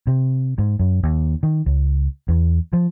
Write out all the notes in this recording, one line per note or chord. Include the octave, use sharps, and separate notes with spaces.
C3
G#2
F#2
D#2
D#3
C#2
E2
F3